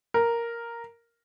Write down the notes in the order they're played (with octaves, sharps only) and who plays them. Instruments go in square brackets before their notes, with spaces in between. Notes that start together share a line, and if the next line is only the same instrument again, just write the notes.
[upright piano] A#4